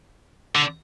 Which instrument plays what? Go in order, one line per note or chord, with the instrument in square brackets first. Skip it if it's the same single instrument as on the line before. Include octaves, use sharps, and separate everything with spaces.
[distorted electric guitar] D3